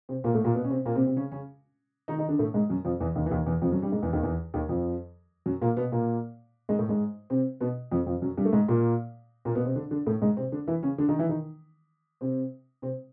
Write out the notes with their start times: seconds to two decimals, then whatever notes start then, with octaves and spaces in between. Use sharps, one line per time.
0.09 C3 C4
0.24 A#2 A#3
0.34 A2 A3
0.44 A#2 A#3
0.55 B2 B3
0.64 C#4
0.70 C3 C4
0.86 A#2 A#3
0.95 C3 C4
1.06 C3 C4
1.16 C#3 C#4
1.32 C#3 C#4
2.08 D#3 D#4
2.19 D#3 D#4
2.28 D3 D4
2.39 A2 A3
2.54 G#2 G#3
2.69 F#2 F#3
2.85 F2 F3
3.00 E2 E3
3.15 D#2 D#3
3.26 E3
3.31 D#2 D#3
3.46 E2 E3
3.62 F2 F3
3.72 F#2 F#3
3.82 G2 G3
3.92 G#2 G#3
4.03 E2 E3
4.13 D#2 D#3
4.23 E2 E3
4.54 D#2 D#3
4.69 F2 F3
5.46 F#2 F#3
5.62 A#2 A#3
5.77 B2 B3
5.92 A#2 A#3
6.69 G#2 G#3
6.79 A2 A3
6.89 G#2 G#3
7.30 C3 C4
7.60 B2 B3
7.92 F2 F3
8.07 F2 F3
8.22 F#2 F#3
8.37 G2 G3
8.45 A3
8.53 G#2 G#3
8.68 A#2 A#3
9.45 A#2 A#3
9.55 B2 B3
9.65 C3 C4
9.76 D3 D4
9.91 D3 D4
10.07 A2 A3
10.22 G#2 G#3
10.37 C3 C4
10.52 D3 D4
10.67 E3 E4
10.83 C#3 C#4
10.98 D3 D4
11.09 D#3 D#4
11.19 E3 E4
11.29 D#3 D#4
12.21 C3 C4
12.82 C3 C4